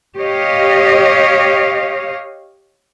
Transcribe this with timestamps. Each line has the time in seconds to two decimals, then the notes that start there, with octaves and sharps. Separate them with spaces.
0.17 G4 C#5 D#5 F5